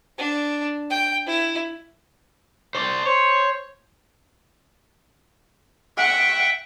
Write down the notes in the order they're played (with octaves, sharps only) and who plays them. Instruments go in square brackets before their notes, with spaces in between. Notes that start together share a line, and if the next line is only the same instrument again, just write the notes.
[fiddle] D4
G5
E4
[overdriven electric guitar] C5 D5
[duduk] C5 [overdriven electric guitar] C#5
[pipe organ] E5 G5 [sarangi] F#5